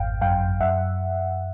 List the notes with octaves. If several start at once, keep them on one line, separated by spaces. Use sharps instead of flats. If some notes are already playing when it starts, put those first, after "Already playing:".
Already playing: G#1 F2 F5 G5
F#2 F5 G5
F#2 E5 F#5